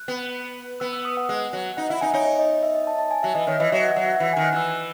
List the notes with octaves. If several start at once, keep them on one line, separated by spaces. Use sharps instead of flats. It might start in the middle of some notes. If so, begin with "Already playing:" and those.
Already playing: F#6
B3
B3 E6
E6
D#6
F#5
G#3
F#3
D#4 F#5
E4 E5
D#4 G#5
D#4 C#5
C#5
D#5
E5
D#5
A5
A5
G#5
F#3 E5
E3 D#5
D#3 C#5
E3 D#5
F#3 E5
F#5
F#3
F#5
E5
E3 F#5
D#3 G#5
F#6
E3 E6